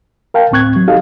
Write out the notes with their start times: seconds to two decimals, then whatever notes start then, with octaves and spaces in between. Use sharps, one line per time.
0.34 A#4 F5 G5 A5
0.51 D2 A2 C4 C#6 F#6 G#6
0.76 F#3
0.87 D#4 F#4 G4 A4 D#5 F5